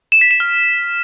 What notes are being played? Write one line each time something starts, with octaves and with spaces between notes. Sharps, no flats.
E7
B6
E7
F6